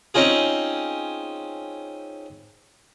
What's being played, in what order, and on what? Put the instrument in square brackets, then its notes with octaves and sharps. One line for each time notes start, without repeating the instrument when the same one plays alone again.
[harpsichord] C4 C#4 D#4 F4 G#4